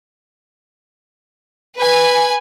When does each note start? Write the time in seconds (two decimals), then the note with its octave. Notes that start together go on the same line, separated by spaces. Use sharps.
1.78 B4 G#5